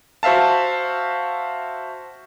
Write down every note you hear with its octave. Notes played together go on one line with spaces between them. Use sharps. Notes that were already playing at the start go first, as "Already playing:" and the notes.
F#4 C5 E5 F5 A5